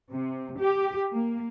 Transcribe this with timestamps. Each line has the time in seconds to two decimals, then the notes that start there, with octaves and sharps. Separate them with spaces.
0.11 C3
0.58 G4
1.12 A#3